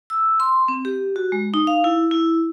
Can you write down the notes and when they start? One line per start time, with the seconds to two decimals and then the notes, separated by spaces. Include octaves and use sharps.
0.10 E6
0.40 C6
0.68 C4
0.85 G4
1.16 F#4
1.32 G#3
1.54 D#4
1.67 F5
1.84 E4
2.11 E4